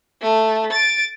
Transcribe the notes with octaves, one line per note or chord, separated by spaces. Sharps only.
A3
A6 D7